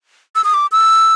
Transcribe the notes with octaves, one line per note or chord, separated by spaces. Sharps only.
E6
D#6
D6
E6